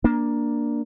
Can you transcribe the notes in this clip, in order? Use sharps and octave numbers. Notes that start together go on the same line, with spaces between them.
A#3 D4